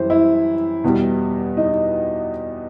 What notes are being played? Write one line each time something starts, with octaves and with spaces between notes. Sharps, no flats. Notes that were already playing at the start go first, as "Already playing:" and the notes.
Already playing: F#2 E3 G3 C5
E4
E2 B2 G3
D#4